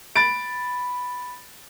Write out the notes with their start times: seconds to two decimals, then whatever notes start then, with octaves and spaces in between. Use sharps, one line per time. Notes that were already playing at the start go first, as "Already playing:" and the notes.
0.16 B5 A6 D7